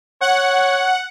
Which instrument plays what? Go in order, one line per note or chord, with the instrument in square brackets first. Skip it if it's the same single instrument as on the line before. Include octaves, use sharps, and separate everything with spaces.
[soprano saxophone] C#5 [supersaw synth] F#5